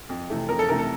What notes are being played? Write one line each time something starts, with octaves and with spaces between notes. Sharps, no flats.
F2
C3 E3 A3
F2 A#4
A4
C3 E3 A3 A#4
A4